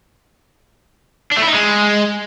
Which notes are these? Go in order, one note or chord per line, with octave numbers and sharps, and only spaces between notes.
D4
A3
E4
D#4
G#3